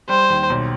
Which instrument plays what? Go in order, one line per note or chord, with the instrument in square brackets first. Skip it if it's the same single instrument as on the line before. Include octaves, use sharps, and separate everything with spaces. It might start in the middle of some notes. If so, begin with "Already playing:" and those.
[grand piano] G3 [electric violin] C5
[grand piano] D#2
B1